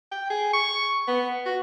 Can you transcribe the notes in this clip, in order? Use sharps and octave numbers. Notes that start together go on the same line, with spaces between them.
G5
G#4
C#6
B3
F#4